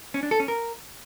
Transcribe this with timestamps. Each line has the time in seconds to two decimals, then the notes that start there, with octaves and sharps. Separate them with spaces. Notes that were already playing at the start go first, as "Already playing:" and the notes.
0.14 C#4
0.23 D4
0.31 A4
0.40 C#4
0.48 A#4